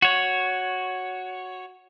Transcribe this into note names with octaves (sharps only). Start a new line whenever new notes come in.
F#4 C#5